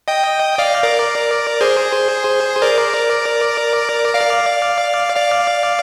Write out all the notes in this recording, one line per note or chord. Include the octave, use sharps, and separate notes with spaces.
D#5 G5
D5 F5
A#4 D5
G#4 C5
A#4 D5
D5 F5
D5 F5